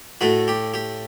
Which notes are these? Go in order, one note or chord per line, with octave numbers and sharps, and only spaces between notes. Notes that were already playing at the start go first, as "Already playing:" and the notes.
A2 A3 F#4
G4
G4